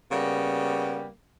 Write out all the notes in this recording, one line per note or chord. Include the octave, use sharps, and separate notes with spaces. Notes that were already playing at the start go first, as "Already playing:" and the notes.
C#3 G3 A#3 B3